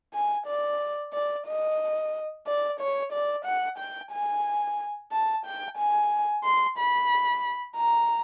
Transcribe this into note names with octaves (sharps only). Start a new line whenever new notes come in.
G#5
D5
D5
D#5
D5
C#5
D5
F#5
G5
G#5
A5
G5
G#5
C6
B5
A#5